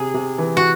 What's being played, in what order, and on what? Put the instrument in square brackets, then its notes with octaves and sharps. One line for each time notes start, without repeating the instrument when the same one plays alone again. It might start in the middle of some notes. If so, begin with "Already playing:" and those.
Already playing: [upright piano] C3 C4 [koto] G#4
[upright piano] C3
E3
[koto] F#4